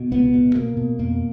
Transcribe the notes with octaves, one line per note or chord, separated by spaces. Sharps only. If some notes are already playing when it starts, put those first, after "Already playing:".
Already playing: B2
C#2 B3
B2
B2 A#3
B2
F2 A#3